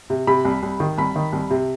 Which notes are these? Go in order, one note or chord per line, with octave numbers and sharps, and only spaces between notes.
C3
C3 B5
C2
C2
D#3
C2 B5
D#3
C2
C3